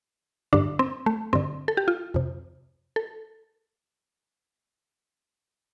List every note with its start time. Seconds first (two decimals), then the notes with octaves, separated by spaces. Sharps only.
0.53 G2 D3 D4
0.79 C4
1.06 A3
1.33 G2 D3 C4
1.68 A4
1.77 G4
1.88 F4
2.14 F2 C3
2.96 A4